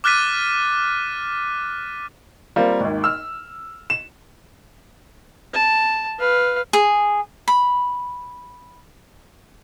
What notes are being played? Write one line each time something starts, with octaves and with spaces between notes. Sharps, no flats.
D6 F6 F#6 A6 B6 D#7
G3 A#3 C4 F4
G#1 D#2
E6 F6
E7
A5
B4 F5
G#4
B5